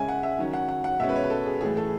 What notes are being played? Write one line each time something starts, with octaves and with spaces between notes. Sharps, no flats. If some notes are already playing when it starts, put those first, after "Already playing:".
Already playing: C#3 G#3 C#4 E5 G#5
F#5
E5
D#3 F#3 C#4
F#5
F#5
F#5
B2 G#3 C#4 E5
B4
C#5
B4
A4
G#4
A2 E3 A3 G#4
A4